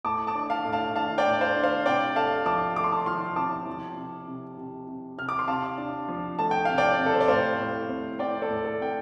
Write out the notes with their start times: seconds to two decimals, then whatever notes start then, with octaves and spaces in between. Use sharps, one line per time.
0.04 A2 A5 D6
0.27 A5 D6
0.35 D4
0.50 F5 A5
0.65 A2
0.72 F5 A5
0.95 D4 F5 A5
1.18 D5 G5
1.26 A2
1.41 C5 F5
1.56 D4
1.63 C5 F5
1.85 C3 D5 G5
2.16 A3 F5 A5
2.46 F3 A5 D6
2.76 A3 D6
2.84 C6
2.92 A5 D6
3.06 F3 C6 F6
3.36 C3 A5 D6
3.67 F3
3.97 C3
4.28 C3
4.57 C3
4.88 C3
5.18 C3 F6
5.29 D6
5.39 C6
5.48 C3 F5 A5
5.78 D4
6.09 F3
6.39 A3 A5
6.51 G5
6.65 C3 F5
6.78 D5 G5
6.99 C3
7.06 A4
7.14 C5
7.21 D5
7.28 A2 C5 F5
7.59 A2
7.89 C4
8.19 C4 D5 G5
8.42 A4 D5
8.49 A2
8.65 A4
8.80 C4 G5